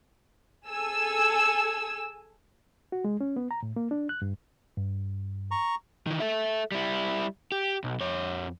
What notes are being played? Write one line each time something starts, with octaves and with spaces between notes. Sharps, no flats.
G#4 A4 G#5 E6
F#4
G#3
C#4
B3
A#5
A2
A#3
D4
F#6
G2
G2
A#5 C#6
D#3 E3
A4 E5
G3 E4
G4
B1
F2 C#5